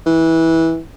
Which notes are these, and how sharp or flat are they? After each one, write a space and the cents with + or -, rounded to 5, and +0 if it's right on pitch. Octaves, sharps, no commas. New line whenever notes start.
E3 -15